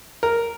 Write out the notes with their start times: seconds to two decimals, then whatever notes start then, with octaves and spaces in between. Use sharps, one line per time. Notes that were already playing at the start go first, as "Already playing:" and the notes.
0.23 A#4